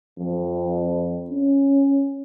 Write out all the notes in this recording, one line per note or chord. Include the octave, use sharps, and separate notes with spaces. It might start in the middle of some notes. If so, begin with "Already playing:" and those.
F2
C#4